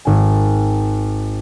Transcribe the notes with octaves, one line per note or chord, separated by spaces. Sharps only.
G#1 G#5